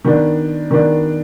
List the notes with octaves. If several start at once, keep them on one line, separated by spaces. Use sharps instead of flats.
D#3 B3 D4
D#3 B3 D4